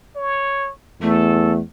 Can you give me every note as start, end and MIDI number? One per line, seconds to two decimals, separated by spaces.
0.16 0.71 73
1.02 1.59 40
1.02 1.59 57
1.02 1.52 69